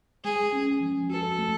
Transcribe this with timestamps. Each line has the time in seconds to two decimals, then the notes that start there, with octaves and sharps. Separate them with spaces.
0.24 G#3 G#4
0.53 C#4
0.81 F3
1.10 F#4 A4
1.39 A3